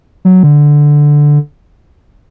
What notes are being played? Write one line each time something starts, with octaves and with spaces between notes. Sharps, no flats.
F#3
D3